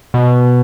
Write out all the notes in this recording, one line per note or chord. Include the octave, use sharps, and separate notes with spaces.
B2